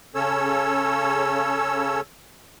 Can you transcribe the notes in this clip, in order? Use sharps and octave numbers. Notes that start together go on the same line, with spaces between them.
C#3 C#4 A4 C#5 E6